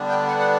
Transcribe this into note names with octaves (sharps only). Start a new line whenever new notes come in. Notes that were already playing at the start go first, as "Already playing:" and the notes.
Already playing: D3 G3 B3 D4
G5
F#5
F#5